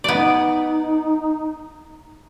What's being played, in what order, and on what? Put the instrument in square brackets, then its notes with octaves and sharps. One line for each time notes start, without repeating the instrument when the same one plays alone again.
[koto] B3 D5 [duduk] D#4